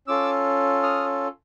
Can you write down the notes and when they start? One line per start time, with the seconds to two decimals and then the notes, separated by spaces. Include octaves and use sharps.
0.07 C#4 F4 A4 D6 E6
0.83 D#6 F6